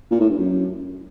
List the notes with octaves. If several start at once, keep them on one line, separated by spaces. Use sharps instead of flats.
A#2
A2
G2
F#2